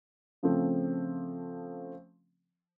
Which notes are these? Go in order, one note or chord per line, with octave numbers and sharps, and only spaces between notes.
C#3 F3 A3 C4